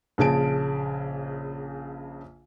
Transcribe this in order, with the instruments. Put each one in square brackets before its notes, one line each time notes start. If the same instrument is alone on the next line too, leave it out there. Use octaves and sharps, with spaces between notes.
[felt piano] A#1 C#3 G#4 A5 D7